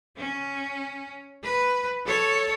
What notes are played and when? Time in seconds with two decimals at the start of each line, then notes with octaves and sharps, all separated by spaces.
0.17 C#4
1.43 B4
2.05 A4 C#5